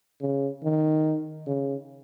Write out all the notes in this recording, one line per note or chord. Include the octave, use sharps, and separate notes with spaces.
C#3
D#3
C#3